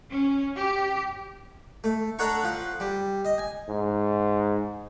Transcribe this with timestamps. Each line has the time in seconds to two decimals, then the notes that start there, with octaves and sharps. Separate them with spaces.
0.10 C#4
0.56 G4
1.84 A3
2.19 D4 A4 C#5 F#5 A#5 C#6
2.44 F3 F#5
2.80 G3
3.25 D#5
3.38 G#5
3.69 G#2